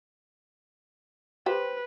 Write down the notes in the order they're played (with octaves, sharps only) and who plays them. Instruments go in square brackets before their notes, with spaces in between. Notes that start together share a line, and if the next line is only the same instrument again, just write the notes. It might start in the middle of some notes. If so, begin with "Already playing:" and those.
[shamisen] G4 C5 [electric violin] B4